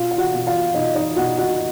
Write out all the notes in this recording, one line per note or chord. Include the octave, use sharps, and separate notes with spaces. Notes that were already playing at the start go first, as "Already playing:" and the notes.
Already playing: B2 F4 F5
F5
F#4 F#5
B2
F4 F5
B2 D#4 D#5
D#4 D#5
B2 F#4 F#5
F#4 F#5